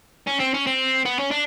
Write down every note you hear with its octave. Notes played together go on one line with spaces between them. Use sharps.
C#4
C4
C#4
C4
B3
C#4
D4